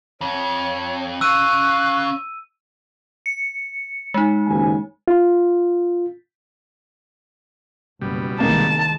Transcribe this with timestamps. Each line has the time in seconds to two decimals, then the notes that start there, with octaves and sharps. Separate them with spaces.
0.21 F2 C#5
1.21 C#4 F5 C#6 E6 F#6 D#7
3.26 C#7
4.14 G#3 D#4
4.48 F#1 D#2 G#5
5.08 F4
8.01 F#1 B2 G3
8.40 C2 D#3 G#3 A#3 A5